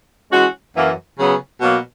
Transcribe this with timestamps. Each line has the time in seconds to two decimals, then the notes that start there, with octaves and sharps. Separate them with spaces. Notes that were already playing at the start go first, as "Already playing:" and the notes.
0.32 E3 G#3 C#4 F#4
0.75 F#2 E3 A#3
1.18 C#3 F#3 B3
1.61 B2 F#3 A#3